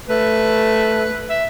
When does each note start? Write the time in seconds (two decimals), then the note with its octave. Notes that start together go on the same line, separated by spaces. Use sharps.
0.09 A3 B4
1.30 E5